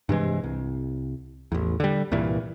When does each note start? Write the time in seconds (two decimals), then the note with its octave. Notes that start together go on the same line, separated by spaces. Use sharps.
0.09 G2 C3 E3 G#3
0.43 C2
1.52 A1 E2
1.80 D3 G3
2.12 C2 G2 A#2 E3